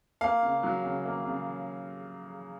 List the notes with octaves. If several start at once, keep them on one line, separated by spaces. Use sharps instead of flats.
A#3 F5
C#3
F#3
C#3
A#3
C#3